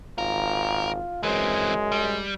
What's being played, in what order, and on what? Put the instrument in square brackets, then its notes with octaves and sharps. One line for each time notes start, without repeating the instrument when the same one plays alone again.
[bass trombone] G#1 [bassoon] F4 [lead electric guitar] A#4
[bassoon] F#2 [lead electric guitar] E3 C4 [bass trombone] G#3
[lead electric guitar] G3